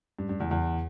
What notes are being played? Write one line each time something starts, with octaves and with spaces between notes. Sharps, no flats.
G2
G2
E2
E2